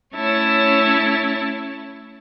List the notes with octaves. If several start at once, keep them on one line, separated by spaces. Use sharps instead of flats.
A3 C#4 E4 C#5 A5